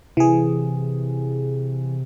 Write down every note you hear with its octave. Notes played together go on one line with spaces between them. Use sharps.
C3 E3 G#4